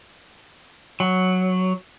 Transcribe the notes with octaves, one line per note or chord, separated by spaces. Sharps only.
F#3